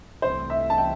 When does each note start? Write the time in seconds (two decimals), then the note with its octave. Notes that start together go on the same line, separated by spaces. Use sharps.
0.21 C2 C3 E3 A3 C4 C5
0.50 E5
0.70 A5
0.78 G5